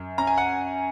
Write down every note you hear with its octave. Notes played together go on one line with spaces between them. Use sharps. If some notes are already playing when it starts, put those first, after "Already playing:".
Already playing: F#2
C#4 A#5
G#5
F#5